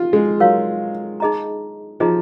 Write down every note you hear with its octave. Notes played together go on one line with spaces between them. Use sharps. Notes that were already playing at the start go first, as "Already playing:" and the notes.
Already playing: F4
G#3
F#3 A#4 C#5 F5
D#4 G#4 D#5 A#5
F3 D#4 G#4 D#5 A#5